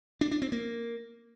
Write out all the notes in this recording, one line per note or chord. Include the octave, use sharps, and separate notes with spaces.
D4
D4
C4
A#3